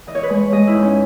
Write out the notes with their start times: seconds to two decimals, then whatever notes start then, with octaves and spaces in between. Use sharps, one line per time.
0.07 E3 D#5
0.15 C#5
0.23 B4
0.30 G#3 C#5
0.52 G#3 D#5
0.67 E4
0.75 G#2
0.82 C#4